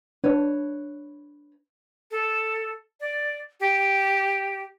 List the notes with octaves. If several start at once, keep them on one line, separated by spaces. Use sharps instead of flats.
D4 B4 C#5
A4
D5
G4